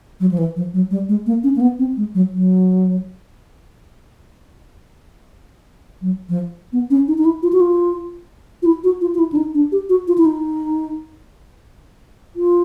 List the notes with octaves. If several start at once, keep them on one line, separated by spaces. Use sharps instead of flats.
F#3
F3
E3
F3
F#3
G3
G#3
A#3
C#4
A#3
B3
C4
G#3
F#3
F#3
F#3
F3
B3
C#4
D#4
D#4
E4
F4
F#4
F4
F4
E4
F#4
F4
F4
E4
D4
D#4
D4
G4
F#4
F4
E4
D#4
F4